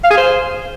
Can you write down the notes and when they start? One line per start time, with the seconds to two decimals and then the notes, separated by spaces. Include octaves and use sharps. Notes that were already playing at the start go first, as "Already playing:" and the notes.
0.04 F5
0.11 G#4
0.17 C5